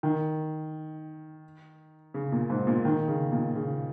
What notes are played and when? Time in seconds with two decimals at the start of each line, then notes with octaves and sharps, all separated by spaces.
0.03 D#3
2.14 C#3
2.32 A#2
2.50 G#2
2.67 A#2
2.85 D#3
3.08 C#3
3.32 A#2
3.55 C#3